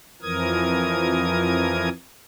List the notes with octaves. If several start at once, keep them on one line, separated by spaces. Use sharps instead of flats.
F2 E3 F3 A#4 D#6 G#6